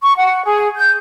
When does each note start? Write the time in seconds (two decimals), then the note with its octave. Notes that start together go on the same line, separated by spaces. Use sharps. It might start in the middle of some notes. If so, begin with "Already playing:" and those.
0.03 C#6
0.17 F#5
0.45 G#4
0.77 G6